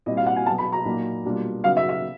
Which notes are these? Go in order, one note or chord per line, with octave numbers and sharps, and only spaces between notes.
A#2 G3 C4 E4 D#5
F5
F#5
G#5
B2 F#3 B3 A5
B5
A#5
A#2 F#3 A#3 D#4
B2 G3 A#3 D4 F4
C#3 F#3 B3 D#4 F5
E5
E5